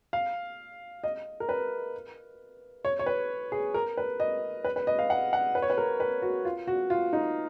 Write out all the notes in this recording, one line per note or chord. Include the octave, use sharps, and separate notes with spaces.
F5
D#5
A#4
B4
C#5
C#5
B4
G#4
A#4
B4
D#5
B4
B4
D#5
F5
F#5
F#5
B4
C#5
B4
A#4
B4
F#4
F4
F#4
F4
D#4